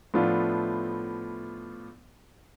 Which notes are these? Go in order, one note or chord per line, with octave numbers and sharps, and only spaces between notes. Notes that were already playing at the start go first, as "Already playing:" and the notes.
A2 F3 A3 B3 D4 F4